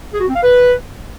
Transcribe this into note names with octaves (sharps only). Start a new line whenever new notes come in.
G#4
F#4
C4
F5
B4